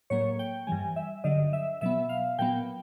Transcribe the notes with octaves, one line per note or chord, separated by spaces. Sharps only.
A2 F#3 A#3 C#5
G5
G2 E3 G3 G#5
E5
G2 D3 F#3 D#5
E5
B2 F#3 B3 E5
F5
A#2 F#3 B3 G5